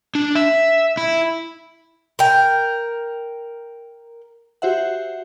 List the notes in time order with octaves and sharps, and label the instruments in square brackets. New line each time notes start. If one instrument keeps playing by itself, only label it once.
[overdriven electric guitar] D4
E5
E4
[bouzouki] A#4 G5
[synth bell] F#4 G4 C5 E5 F#5